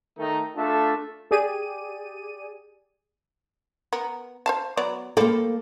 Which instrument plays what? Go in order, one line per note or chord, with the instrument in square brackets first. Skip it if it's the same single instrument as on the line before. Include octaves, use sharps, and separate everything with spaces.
[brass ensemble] D#3 A3 D#4
A3 D4 F4 A4 E5 A5
[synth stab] G4 G#4 D5 D#7
[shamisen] B3 A#4
C5 F5 A5
F#3 B3 D5
[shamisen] F3 G3 D5 [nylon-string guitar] A#3 A4